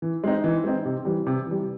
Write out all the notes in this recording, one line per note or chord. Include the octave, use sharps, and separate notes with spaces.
E3
G#3 C4 D#4
E3
G#3 C4 D#4
C3
E3 G3
C3
E3 G3